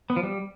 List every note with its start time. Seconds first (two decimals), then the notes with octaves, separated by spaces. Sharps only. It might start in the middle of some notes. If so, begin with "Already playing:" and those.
0.10 B3
0.16 F3
0.23 G3